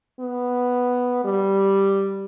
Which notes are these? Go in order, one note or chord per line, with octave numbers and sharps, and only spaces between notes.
B3
G3